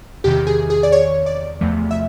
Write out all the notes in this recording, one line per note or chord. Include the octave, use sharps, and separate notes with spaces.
E2 C3 D#3 G4
G#4
G#4
D5
C#5
D5
E2 C3 F3 A3
E5